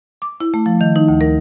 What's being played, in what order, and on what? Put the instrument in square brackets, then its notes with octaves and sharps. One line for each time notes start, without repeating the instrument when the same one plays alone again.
[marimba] D6
E4
A3
F3
D#3
D#4
D2
A#4